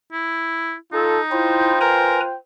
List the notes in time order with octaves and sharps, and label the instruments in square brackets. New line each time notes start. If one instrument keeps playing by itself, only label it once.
[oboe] E4
[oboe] D#4 [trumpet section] F4 A4
[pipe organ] E4 [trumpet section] F4 C5 G5
[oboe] A#4 [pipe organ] B4 G#5 A#5